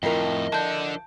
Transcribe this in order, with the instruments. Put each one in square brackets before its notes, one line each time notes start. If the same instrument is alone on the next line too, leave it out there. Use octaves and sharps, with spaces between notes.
[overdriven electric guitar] F2 A2 [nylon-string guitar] F3 E4 A#4 [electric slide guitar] D#5
[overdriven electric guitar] D3 D4 [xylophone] A5 G6